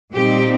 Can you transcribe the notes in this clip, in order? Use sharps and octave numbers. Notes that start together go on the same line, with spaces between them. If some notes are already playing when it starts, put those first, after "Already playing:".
A#2 G3 C4 D#4 G4